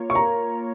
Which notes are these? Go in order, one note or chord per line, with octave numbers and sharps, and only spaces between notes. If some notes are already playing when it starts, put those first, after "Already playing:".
Already playing: A#3 F4 A#4 C#5
C#6
A#5